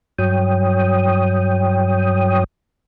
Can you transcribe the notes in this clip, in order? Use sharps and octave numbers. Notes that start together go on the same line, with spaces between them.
G2 F#3 C#5 G5 D#6